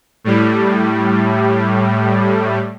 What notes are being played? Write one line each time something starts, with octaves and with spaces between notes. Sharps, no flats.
A2 G3